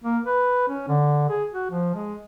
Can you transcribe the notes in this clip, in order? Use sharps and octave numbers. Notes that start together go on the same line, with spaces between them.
A#3
B4
C#4
D3
G#4
F#4
F3
G#3